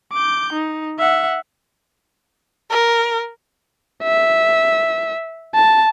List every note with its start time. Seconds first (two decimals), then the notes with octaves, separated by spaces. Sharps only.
0.13 D6 G6
0.53 D#4
0.99 E5 F#5
2.71 A#4
4.03 E5
5.55 A5